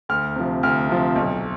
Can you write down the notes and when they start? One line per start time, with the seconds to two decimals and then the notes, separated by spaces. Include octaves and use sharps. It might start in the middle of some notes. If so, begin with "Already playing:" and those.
0.09 D2 F6
0.36 C3 F3
0.63 D2 F6
0.89 C3 F3
1.16 B1